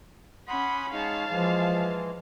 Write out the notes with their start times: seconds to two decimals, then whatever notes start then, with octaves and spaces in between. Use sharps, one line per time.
0.48 C#4 F#5 B5 C6 D#6
0.93 G#3 D#4 C#5 F5 A5
1.30 E3 F3 G#3